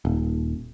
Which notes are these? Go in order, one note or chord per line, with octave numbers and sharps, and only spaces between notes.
D#1